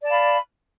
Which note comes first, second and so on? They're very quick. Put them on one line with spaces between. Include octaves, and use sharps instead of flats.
D5 A5 F5 B5